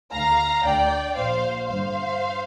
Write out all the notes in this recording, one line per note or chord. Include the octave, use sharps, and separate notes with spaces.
D2 D3 F5 A#5
D2 D3 D5 G5
A#1 A#2 C5 F5
G1 G2 D3 C5 F5